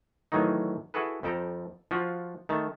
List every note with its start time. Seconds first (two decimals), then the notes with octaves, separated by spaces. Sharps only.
0.32 A2 D#3 E3 F#3 D#4
0.94 E4 F#4 G#4 A4 B4
1.23 F2 F3 A4 G5 A#5
1.91 F3 F4 F#4
2.49 D#3 A3 A5